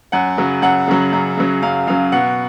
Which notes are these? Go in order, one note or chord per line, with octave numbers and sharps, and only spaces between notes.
F#2 F#5
C#3 F#3
F#2 F#5
C#3 F#3
F#2
C#3 F#3
F#2 F5
C#3 F#3 F5
B2 F#5